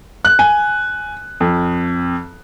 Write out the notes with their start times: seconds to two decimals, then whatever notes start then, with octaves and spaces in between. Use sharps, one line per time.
0.25 F#6
0.39 G#5
1.40 F2